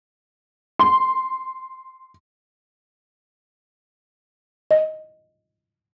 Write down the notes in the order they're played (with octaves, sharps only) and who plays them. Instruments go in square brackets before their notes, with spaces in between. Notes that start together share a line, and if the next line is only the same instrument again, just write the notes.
[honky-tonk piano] C6
[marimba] D#5